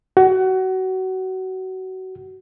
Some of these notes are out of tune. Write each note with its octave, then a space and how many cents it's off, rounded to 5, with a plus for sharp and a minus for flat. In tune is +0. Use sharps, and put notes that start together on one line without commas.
F#4 +25